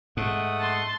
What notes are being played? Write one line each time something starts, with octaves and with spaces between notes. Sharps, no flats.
G#2 A3 F#5 D#6
A5 C6